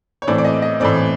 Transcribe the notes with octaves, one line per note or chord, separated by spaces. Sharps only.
C#5
A2 E3 A3 C4 D5
D5
D#5
D#5
A2 E3 A3 C4 D5